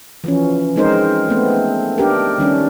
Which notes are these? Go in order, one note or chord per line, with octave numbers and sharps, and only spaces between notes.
E3 F3 C#4
G#3 C4 D#4 A#4 C5
A3 B3 C4
D4 G4 A#4
D#3 G3 C#4 D4